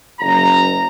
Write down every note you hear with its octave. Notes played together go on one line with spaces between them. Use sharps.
F#1 A#5